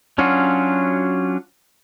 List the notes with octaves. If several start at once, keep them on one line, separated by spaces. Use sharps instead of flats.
F#3 C#4 D4 F4 F#4